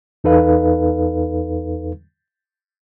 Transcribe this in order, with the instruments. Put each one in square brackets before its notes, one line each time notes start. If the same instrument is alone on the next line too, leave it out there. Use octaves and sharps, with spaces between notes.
[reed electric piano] E2 D#4 A4 B4 F5